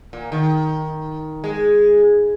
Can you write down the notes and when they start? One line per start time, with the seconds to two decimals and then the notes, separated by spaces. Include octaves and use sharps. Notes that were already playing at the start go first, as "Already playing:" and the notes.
0.13 A#2
0.32 D#3
1.44 G#3